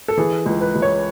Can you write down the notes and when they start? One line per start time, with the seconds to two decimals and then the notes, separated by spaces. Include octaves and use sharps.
0.08 A4
0.17 E3 G#4
0.46 C#2
0.61 B4
0.75 C#2
0.82 C#5